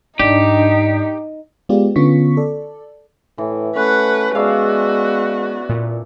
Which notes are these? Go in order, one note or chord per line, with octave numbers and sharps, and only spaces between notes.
G#2 D4 D#4 G4
G#3 B3 F4 G4 D5
D3 B3 C#4 F4 C#6 B6
A4 D5
A2 E3
A3 C#4 B4 F#5
G#3 B3 F#4 A4 D5 E5 F5
A#2